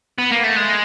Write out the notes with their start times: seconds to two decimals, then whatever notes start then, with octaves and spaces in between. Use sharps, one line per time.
0.19 B3
0.31 A#3
0.44 A3
0.57 G#3